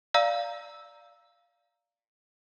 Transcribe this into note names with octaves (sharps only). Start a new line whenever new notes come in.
D5 F5 A#5 E6